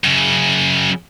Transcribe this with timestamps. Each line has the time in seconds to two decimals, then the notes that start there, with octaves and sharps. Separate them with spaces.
0.04 F#2 C#3